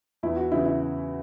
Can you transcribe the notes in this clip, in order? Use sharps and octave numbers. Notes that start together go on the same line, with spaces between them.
E2 E4
F#4
C#3 E3 E4
E4